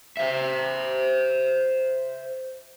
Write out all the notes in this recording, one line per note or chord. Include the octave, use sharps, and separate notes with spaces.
C5 E5